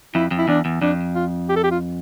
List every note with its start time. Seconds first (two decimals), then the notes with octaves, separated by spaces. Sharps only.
0.15 F2 E4
0.31 F2
0.38 E4
0.48 E2 D4
0.65 E2
0.82 F2 D4
1.15 F4
1.49 G4
1.56 A4
1.64 G4
1.71 F4